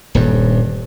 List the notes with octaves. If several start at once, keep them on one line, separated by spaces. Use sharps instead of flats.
D#1 G2